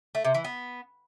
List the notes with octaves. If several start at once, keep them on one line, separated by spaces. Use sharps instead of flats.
A3
C3
E3
B3